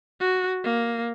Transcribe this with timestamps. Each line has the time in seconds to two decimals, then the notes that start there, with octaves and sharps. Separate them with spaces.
0.21 F#4
0.64 A#3